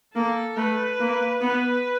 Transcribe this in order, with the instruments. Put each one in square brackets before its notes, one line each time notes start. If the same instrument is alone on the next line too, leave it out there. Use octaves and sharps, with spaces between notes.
[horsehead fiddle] A#3 [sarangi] A4
[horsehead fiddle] A3 [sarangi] B4
[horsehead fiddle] A#3
[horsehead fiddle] B3 [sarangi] B4